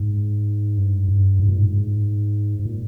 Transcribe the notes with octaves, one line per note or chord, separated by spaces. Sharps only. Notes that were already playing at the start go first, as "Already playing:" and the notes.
Already playing: G#2
G2
G2
G#2
A#2
G#2
G#2
A#2